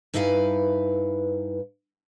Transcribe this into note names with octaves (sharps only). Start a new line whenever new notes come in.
G2 D#4 E4 B4 F5 G#5